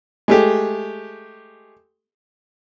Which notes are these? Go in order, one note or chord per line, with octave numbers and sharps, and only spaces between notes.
G#3 A3 G4